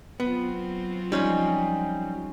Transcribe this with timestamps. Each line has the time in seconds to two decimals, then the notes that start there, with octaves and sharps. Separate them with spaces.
0.20 F#3 B3 C4 F4
1.12 F3 G3 C#4 D#4